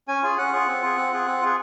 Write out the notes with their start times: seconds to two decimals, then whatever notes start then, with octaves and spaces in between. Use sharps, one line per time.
0.08 C#4 G#5
0.23 F4 G#4
0.38 C#4 F#5
0.52 F4 G#4
0.67 C4
0.82 F4 G#4
0.97 C4
1.12 F4 G#4
1.27 C4
1.41 F4 G#4